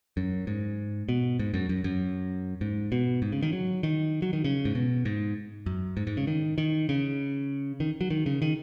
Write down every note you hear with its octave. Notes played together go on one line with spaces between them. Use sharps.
F#2
G#2
B2
G#2
F#2
F#2
F#2
G#2
B2
G#2
C#3
D#3
F#3
D#3
F#3
D#3
C#3
G#2
B2
G#2
F#2
G#2
G#2
C#3
D#3
D#3
C#3
D#3
F#3
D#3
C#3
D#3